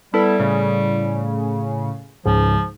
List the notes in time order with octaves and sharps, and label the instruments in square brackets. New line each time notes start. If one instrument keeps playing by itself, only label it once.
[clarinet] G3 [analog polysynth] B3 E4 A4
[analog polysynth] A2 C#3
[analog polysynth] C#2 G#2 [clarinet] F3